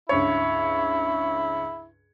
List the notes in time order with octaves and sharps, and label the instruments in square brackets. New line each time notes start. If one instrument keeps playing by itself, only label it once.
[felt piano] C#2 G2 C#5 [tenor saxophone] E4